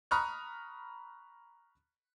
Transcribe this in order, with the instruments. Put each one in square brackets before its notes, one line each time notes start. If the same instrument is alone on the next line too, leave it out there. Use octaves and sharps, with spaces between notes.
[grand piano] A#5 B5 C#6 D#6 F6 F#6